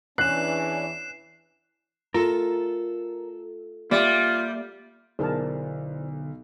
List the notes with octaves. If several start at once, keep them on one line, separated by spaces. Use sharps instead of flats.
E2 E3 C#4 D4 F#6 C7 E7
A3 F4 A4 A#4
G3 A#3 F4 D5 E5
B1 D3 E4 G#4 A#4 C5 D5 A5